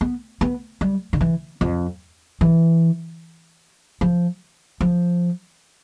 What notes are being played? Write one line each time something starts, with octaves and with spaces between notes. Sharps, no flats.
B3
B3
G3
D3
E3
F2
E3
F3
F3